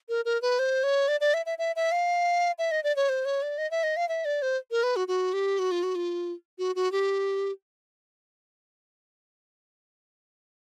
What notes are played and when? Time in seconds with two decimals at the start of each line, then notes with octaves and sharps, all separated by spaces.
0.09 A#4
0.25 A#4
0.42 B4
0.59 C5
0.83 C#5
1.08 D5
1.21 D5
1.34 E5
1.46 E5
1.58 E5
1.76 E5
1.92 F5
2.58 E5
2.71 D#5
2.84 D5
2.96 C#5
3.09 C5
3.25 C#5
3.42 D5
3.58 D#5
3.71 E5
3.83 D#5
3.97 F5
4.09 E5
4.25 D5
4.42 C5
4.71 A#4
4.83 B4
4.96 F#4
5.08 F#4
5.33 G4
5.59 F#4
5.71 F4
5.83 F#4
5.95 F4
6.58 F#4
6.75 F#4
6.92 G4